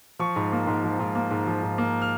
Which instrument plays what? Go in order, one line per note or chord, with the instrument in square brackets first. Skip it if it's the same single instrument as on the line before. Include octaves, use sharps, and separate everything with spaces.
[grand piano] F3 C#6
G#2
A#3
G#2
F3
G#2
A#3
G#2
F3
G#2
A#3
F6